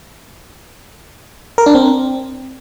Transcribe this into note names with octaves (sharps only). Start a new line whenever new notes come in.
A#4
D4
C4